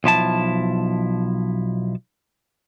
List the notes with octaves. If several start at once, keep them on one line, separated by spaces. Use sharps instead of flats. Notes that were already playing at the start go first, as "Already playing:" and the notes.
B1 F3 E4 A5